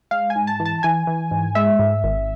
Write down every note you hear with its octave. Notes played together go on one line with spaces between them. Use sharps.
G#3 F5
G#5
G#2
A5
E3
A5
E3 G#5
E3
G#2
G#3 E5
G#2
G#1